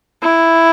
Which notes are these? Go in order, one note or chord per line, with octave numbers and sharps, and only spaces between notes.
E4